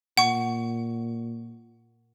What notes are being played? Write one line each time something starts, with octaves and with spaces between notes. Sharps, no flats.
A#2 F#5 C#6